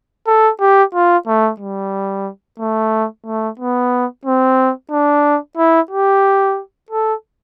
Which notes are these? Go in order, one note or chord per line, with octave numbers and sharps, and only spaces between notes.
A4
G4
F4
A3
G3
A3
A3
B3
C4
D4
E4
G4
A4